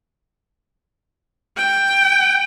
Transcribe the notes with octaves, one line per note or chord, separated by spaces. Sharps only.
G5